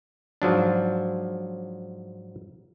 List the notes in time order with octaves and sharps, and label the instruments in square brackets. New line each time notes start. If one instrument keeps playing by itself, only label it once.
[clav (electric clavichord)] G#2 F3 F#3 D4